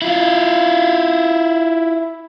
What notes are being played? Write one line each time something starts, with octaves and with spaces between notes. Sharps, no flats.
E4 F4